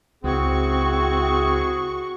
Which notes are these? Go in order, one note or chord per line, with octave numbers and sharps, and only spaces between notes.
C#2 C4 E4 F#4 G#4 C#6